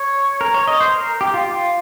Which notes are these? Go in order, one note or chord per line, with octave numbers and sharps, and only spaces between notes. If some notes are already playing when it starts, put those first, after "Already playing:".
Already playing: C#5
A#4
C#5
D#5
C5
A#4
G4
F4
F4